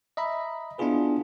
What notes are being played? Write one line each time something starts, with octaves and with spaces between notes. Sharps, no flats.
D#5 E5 A#5 B5
B3 D4 E4 F4 G#4 B4